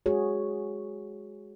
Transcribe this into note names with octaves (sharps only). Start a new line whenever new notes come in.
G#3 F#4 G#4 C#5